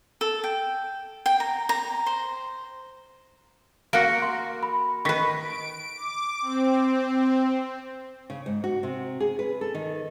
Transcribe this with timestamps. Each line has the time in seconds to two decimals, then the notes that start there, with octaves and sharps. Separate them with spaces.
0.21 A4
0.44 G5
1.26 G5
1.40 A#5
1.69 A#5
2.06 C5
3.93 A#3 F#4 A#6 C#7 D7
4.22 C6
4.63 B5
5.05 D#3 B4 C#6 B6
5.38 D7
5.95 D6
6.42 C4
8.30 C#3
8.46 G#2
8.64 F#4
8.83 C3
9.20 G#4
9.39 B4
9.61 A4
9.74 D#3